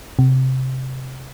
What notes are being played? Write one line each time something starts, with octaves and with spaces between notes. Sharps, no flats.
C3